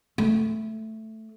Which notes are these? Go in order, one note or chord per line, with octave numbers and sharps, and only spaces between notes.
A3